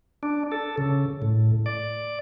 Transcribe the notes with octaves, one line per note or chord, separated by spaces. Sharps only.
D4
A4
C#3
A2
D5